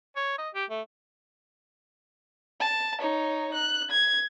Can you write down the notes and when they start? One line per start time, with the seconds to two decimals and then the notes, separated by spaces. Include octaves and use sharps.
0.16 C#5
0.38 D#5
0.55 G4
0.70 A3
2.60 A5
3.01 D#4 C#5
3.54 F#6
3.91 G#6